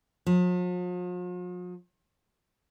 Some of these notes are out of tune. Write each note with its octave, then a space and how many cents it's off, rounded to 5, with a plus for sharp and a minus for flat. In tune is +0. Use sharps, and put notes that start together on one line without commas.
F3 +45